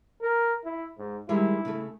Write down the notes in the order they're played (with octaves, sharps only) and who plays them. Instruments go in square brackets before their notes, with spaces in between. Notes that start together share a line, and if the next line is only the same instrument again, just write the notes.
[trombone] A#4
E4
G#2
[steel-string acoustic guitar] D#3 G3 G#3 [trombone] E4
[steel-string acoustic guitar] C#3 A3